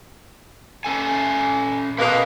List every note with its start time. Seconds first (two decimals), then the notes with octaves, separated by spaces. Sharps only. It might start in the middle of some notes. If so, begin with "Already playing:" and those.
0.85 C#4 A4 G#5
1.99 B2 G#3 A#3 B4 D#5